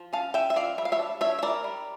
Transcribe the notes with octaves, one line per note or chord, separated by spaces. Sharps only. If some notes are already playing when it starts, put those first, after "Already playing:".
Already playing: F3
C#4 F5 A5
C#4 E5 G5
E5
F3 D5 F5
G3 E5
F5
C#5 E5
D4
D4 C#5 E5
E5
G3 A#4 D5
G3